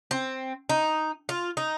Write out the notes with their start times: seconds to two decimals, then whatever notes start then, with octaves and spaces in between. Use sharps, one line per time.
0.11 C4
0.69 D#4
1.29 F4
1.57 D#4